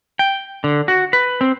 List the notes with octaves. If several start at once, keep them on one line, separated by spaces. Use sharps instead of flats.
G5
D3
F#4
B4
C4